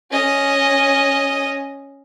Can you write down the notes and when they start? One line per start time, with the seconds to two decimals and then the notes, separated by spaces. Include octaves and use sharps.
0.11 C#4 D#5